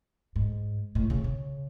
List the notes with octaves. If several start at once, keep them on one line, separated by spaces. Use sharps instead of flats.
G#2
A2
C#3
C#3